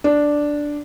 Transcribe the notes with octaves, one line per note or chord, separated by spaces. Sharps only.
D4